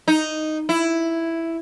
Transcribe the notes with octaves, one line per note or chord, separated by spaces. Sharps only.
D#4
E4